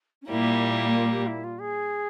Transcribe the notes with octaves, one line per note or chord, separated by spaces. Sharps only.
C#4
A#2 G3 A#3 E4
F4
G4
E4
F4
G#4